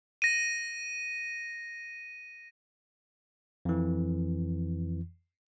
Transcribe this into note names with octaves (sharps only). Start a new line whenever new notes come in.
A#6 D#7
F2 E3